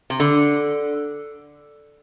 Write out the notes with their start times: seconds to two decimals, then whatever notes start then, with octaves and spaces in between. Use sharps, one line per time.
0.10 C3
0.20 D3